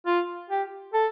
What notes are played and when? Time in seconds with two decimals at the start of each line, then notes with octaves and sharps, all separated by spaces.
0.07 F4
0.50 G4
0.94 A4